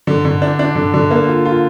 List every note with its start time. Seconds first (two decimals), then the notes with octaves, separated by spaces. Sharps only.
0.07 D3
0.25 D3
0.42 D4
0.59 D4
0.76 D3
0.94 D3
1.11 A#3
1.28 F4
1.45 F4